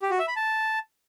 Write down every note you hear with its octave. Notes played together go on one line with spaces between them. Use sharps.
G4
F#4
E5
B5
A5